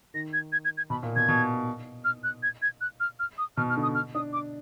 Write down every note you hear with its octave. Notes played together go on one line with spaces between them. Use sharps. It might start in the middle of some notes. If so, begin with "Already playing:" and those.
D#3 A#6
G#6
G#6
G#6
G#6
B2 B5
A#2
B2 G#6
B2
F6
F#6
G#6
G#6
F#6
F6
F6
D#6
B2 F6
F6
D3
D#6
F6
D4 D#6
D6